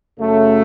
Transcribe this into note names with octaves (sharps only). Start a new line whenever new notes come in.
F#2 C#3 F#3 A3